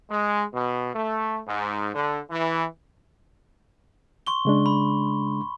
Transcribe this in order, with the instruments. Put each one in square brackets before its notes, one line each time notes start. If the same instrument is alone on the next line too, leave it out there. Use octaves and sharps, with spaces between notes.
[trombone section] G#3
B2
A3
G#2
D3
E3
[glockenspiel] C6 C#6 G7
[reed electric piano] C#3 G#3 D4
[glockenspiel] B5